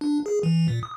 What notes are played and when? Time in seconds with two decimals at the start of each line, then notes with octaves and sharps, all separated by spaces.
0.01 D4
0.26 G#4
0.43 E3
0.68 A#2
0.83 D#6